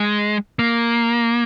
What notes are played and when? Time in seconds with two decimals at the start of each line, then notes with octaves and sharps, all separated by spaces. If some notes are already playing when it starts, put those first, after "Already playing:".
Already playing: G#3
0.59 A#3